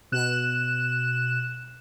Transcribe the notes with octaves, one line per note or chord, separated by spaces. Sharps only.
B2 F#6 E7